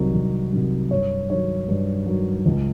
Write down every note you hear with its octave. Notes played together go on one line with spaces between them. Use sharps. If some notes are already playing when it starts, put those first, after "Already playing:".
Already playing: C2 C3 D#3 F#3
C2
C3 D#3 F#3
G2 C#5
D#3 F#3 C#5
G2
D#3 F#3
C#2